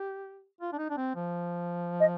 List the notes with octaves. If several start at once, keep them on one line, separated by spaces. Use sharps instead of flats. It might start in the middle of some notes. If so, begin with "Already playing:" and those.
Already playing: G4
F4
D4
D#4
D4
C4
F3
D#5